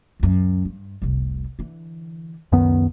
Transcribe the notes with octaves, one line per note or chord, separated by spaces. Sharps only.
C#2 F#2
G2
F1 C2
D3 E3
C#2 F#2 D#3 B3